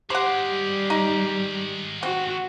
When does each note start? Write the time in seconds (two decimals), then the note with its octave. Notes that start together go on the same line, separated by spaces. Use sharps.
0.10 D#3 G#3 G4 C5 F#5
0.48 G3
0.90 D#4
2.03 C4 F#4